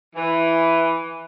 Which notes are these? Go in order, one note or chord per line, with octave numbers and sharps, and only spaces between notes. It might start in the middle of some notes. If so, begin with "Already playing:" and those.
E3